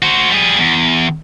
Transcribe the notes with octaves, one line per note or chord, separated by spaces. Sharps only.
F#4 C5
G3 G#4
E2